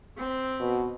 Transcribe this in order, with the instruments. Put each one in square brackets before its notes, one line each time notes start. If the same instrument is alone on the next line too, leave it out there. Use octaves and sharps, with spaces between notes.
[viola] C4
[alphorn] B2